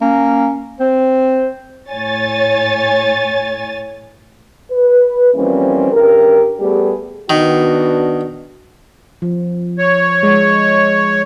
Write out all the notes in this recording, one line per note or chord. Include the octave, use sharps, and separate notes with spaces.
A#3 C#4
C4 C5
A2 C#5 G#5 A6
B4
E3 F3 G3 A#3 C4 C#4
G2 C#3 G4 A#4
G3 A3 B3 G4 G#4
D#3 B3 D4 F#4
F3
C#5
G#3